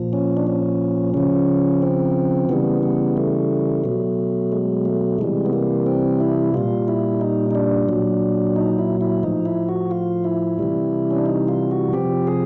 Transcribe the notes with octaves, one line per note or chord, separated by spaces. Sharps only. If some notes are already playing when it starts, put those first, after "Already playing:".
Already playing: A#2 F3
C#4
D4
C#4
C#3 F3 C#4
C4
C#3 E3 G3 B3
B3
A3
B2 F#3
G#3
A3
C3 E3 G3 G#3
B3
A#3
C4
E4
A#2 G3 F4
E4
D#4
D#4
D4
A#2 F#3
D#4
E4
E4
A2 F3 D#4
E4
F#4
F4
E4
C3 E3 G3
C#4
D4
D#4
F4
F#4
C3 F3 G4
G#4